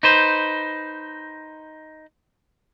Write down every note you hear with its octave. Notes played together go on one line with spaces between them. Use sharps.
D#4 B4 C5